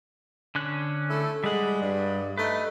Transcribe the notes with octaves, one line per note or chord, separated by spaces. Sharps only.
D3 C#4 F#6
A3 E4 A4
G3 G#3 F#5
G2
A3 D#4 B4